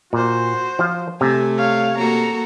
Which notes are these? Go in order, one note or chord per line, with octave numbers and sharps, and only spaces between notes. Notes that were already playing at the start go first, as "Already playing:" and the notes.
A#2 F#4 C5
F3 F4
C3 A3 G#5
C#5 F5
A#3 F#4 A4 A#5